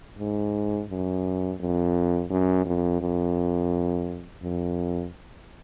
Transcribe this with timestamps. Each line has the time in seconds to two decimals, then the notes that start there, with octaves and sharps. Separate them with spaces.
0.19 G#2
0.90 F#2
1.60 F2
2.31 F#2
2.66 F2
3.01 F2
4.42 F2